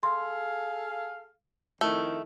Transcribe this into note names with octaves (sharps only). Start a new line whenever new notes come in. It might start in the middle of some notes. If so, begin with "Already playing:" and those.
G#4 A4 F5 C6
F2 D#3 A3 E4